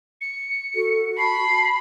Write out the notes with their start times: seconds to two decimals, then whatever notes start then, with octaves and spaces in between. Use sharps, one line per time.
0.21 C#7
0.75 F#4 A4
1.18 A5 B5 C7